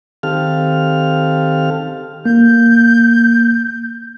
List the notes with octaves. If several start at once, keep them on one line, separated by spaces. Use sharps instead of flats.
D#3 C4 G4 A4 F5 F6
A#3 G6